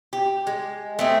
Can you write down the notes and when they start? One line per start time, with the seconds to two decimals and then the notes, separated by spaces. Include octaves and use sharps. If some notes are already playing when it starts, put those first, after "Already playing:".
0.13 G4
0.47 G#3
0.99 A3 C4 G#4